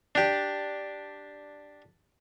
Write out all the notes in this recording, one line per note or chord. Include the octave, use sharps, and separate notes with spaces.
D4 G4